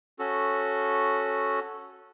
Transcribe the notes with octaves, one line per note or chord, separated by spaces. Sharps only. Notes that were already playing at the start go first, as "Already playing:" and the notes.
C#4 F#4 A4